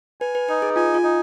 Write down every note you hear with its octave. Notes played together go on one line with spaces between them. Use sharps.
B4 G#5
B4
D#4 B4
G#4
F4 G#5
F4
D#4